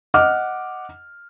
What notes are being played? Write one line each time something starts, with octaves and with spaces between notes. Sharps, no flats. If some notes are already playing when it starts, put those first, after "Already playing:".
D#5 F#5 D6 F6